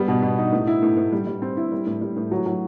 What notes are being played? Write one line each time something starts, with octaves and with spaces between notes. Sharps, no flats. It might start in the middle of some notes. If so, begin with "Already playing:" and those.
Already playing: G3 B3
B2
B2
D#4
A2
E4
A2
A2
G3
G3
C4
E4
G3
A2
G3
A2
F#3
F#3